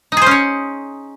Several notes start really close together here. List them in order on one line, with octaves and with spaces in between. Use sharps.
D#4 G#4 C5 C#4 C#5